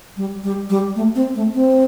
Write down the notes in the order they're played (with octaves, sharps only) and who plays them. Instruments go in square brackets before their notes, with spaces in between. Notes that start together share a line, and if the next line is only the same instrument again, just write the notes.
[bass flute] G3
G3
G3
A3
C4
A3
C4